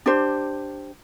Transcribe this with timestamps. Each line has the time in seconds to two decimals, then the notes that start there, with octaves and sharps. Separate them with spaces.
0.06 D4 G4 C5